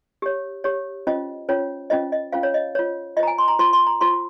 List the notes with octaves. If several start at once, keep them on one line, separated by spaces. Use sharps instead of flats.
G4 C#5
G4 C#5
C#4 F4 C5 D#5
C#4 F4 C5 C#5
C#4 F4 C5 D#5
D#5
C#4 F4 C5 F5
C#5
D#5
F4 C5 C#5
F4 C5 D#5 A#5
G#5
C6
A#5
F4 C5 C6
C6
A#5
F4 C5 C6